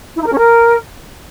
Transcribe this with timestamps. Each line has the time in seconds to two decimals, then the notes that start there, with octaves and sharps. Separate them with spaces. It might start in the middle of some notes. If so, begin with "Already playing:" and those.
0.16 E4
0.21 D#4
0.27 A#4
0.33 C#4
0.38 A#4